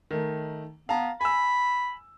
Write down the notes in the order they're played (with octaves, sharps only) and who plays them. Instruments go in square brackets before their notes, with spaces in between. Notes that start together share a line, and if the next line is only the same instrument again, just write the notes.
[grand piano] D#3 A3
[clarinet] B3 [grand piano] F5 A5 A#5
[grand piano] G#5 E6 [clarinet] B5